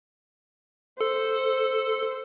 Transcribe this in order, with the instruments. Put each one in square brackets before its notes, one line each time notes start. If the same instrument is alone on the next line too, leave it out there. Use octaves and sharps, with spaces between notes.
[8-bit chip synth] A4 [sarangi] C5